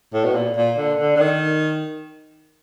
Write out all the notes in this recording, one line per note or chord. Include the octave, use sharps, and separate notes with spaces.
A2
B2
A#2
A#2
D3
D3
D3
D#3